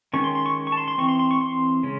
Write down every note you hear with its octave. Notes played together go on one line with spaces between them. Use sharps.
D#3 G#3 C#4 C#6
C6
C6
C#6
C#6
A5
C6
C6
E3 C4 C#6
C6
C6
C#6
C6
C#3 G#3 C#4